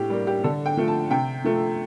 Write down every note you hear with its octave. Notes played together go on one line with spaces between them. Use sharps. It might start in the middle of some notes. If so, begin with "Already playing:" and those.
Already playing: A2 G4
G3 A#3
G4
D3 A4
G5
F3 A3
A5
C3 G5
F3 A3